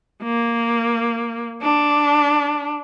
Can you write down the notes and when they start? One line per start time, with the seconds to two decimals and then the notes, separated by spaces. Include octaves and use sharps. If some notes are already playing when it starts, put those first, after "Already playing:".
0.23 A#3
1.62 D4